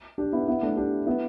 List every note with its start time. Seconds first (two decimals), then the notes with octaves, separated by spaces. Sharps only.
0.18 D4 G4
0.32 B3 E4
0.48 B3 E4
0.63 A3 D4
0.77 D4 G4
1.07 B3 E4